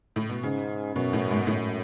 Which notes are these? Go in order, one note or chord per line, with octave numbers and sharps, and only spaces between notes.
A2
B2
G#2 C#3
F#2 B2
A2
G#2
F#2 A2